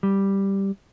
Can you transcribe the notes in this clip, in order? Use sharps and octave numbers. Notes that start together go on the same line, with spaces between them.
G3